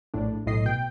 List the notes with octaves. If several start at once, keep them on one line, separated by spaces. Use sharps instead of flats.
A#1 A2 D4
B1 A2 D#5 C7
B2 G5